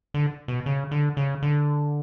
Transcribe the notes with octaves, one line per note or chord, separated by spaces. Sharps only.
D3
B2
C#3
D3
C#3
D3